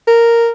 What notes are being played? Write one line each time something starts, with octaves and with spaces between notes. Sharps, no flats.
A#4